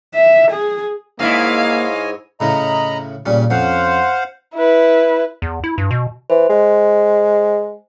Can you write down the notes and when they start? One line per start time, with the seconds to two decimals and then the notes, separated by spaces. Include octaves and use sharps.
0.14 E5
0.51 G#4
1.20 G#2 A#3 E4 C#5 D#5 F5 G#5
2.40 A2 C#3 E4 D#5 A#5 B5
3.26 A#2 C#3 G3 C#4
3.50 F2 C#4 C5 F5 F#5
4.54 E4 B4
5.42 E2
5.64 E4
5.78 G2
5.91 B2
6.30 E3 C5
6.49 G#3